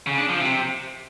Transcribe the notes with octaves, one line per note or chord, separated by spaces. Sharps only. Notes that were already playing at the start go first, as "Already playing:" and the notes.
C#3
D4
F3
C3